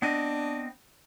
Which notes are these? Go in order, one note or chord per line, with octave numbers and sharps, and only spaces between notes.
B3 C4 D4 D#5